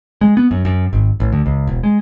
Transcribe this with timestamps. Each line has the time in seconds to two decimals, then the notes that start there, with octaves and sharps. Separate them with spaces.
0.21 G#3
0.37 B3
0.51 F#2
0.65 F#2
0.93 G#1
1.20 A1
1.32 D2
1.46 C#2
1.67 E1
1.83 G#3